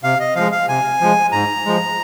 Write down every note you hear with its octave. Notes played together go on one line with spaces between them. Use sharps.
C3 F5
D#5
F3 G#3 F5
F5
C3 G#5
F3 G#3
G#2 A#5
F3 G#3